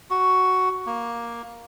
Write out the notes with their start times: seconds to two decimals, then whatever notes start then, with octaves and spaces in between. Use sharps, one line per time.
0.11 F#4
0.86 A#3